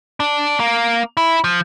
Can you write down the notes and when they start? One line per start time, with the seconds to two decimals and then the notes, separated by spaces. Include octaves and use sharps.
0.20 D4
0.60 A#3
1.17 E4
1.44 F3